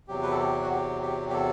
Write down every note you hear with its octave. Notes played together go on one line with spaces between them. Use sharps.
E2 C3 F#3 G4
B4
A4
G4
F#4
G4
G4
G4
A4